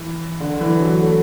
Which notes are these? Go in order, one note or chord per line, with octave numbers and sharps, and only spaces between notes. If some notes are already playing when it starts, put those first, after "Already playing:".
Already playing: E3
D3
E3
F#3
A3